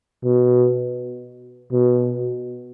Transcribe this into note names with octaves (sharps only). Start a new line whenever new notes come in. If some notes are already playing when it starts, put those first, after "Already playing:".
B2
B2